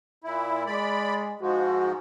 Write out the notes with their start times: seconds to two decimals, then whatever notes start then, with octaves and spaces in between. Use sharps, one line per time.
0.24 A#2 E4
0.66 G#3 D5 B5
1.41 G#2 F3 G#3 F#4